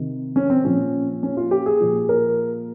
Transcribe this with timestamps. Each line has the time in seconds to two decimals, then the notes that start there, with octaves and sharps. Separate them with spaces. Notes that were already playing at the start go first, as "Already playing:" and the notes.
Already playing: C3 D#3
0.36 C#4
0.50 C4
0.65 A#2 F3 C#4
1.23 C#4
1.37 F4
1.51 G4
1.66 G#4
1.80 A#2 F3
2.09 A#4